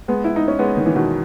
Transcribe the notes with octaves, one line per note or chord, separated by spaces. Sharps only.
G#3 B3
E4
D#4
C#4
G#3 B3
D#3
E3
B2 D#3